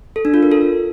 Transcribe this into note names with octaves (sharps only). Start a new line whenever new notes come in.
A4
D4
F4
A#4
A4